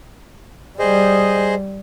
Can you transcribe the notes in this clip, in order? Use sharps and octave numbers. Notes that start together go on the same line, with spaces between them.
G3 G#4 C5 D#5